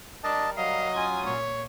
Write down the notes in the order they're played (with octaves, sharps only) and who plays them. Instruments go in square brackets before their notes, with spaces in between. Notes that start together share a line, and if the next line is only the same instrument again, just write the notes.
[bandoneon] G3 A#4 [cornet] D4 [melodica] D#5 A5
[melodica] F#3 [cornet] D#5 [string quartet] F5
[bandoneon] C#4 F4 C6 [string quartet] G#5 D#6
[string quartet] A#2 [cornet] C#5